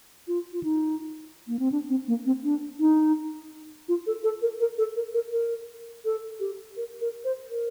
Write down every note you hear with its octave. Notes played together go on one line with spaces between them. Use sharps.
F4
F4
D#4
A#3
C4
D4
C4
A#3
C4
D4
D#4
F4
A4
A4
A#4
A#4
A4
A#4
A#4
A#4
A4
G4
A#4
A#4
C5
A#4